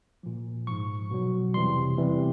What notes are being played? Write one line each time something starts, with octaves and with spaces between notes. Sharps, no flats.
A#2 F3
G#2 F3 C#6
B2 F#3
F2 C3 E3 G3 C6
E2 C3 E3 G3